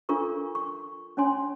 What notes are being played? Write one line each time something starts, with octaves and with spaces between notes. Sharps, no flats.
D4 F4 A4 A#4 C#6
C#6
C#4 D4 C#5 G#5 C6